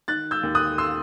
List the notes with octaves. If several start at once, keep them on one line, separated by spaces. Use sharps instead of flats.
D#3 F#6 A6
E6 G6
D#2
D#6 F#6
C6 E6